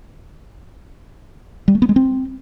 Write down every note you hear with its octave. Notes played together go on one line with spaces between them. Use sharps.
G3
A3
B3
G#3
C4